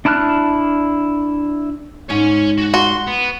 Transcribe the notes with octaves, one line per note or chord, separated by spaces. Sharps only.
D4 E4 A5 F6 F#6
G#2 C#5 G#5
F#4
F#4 C6
B3